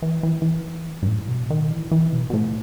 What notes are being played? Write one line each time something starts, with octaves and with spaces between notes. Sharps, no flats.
E3
E3
E3
G2
A2
B2
D#3
E3
E3
B2
B2
A2